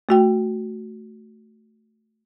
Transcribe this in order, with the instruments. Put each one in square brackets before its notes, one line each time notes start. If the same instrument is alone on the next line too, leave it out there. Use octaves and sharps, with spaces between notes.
[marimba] A3 F#4 G5